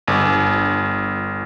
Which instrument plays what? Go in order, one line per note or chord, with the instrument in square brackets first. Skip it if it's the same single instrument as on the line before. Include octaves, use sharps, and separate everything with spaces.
[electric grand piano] G1